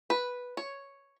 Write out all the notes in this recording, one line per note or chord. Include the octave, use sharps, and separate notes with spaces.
B4
C#5